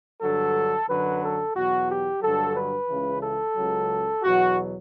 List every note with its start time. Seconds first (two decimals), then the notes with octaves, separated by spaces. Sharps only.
0.21 G2 D3 F#3 A4
0.88 F#2 D3 F#3 B4
1.22 A4
1.55 E2 B2 F#3 F#4
1.89 G4
2.22 G2 D3 F#3 A4
2.55 B4
2.88 C#2 C#3 E3
3.22 A4
3.55 C#2 C#3 F#3
4.22 E2 B2 F#3 F#4